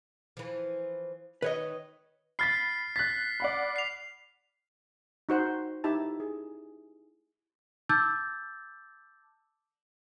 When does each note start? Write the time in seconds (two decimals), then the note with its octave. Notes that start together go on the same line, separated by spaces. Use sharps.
0.37 E3 F3
1.42 D#3 B4 C#5 D#5
2.39 B5 F6 A6 B6 C7
2.96 F#6 A6 B6
3.40 D5 F#5 B5
3.76 C7 F7
5.29 D#4 F#4 C5 F#5
5.84 D#4 E4 G4 A5
6.20 G#4
7.89 A5 D6 E6 G6 A6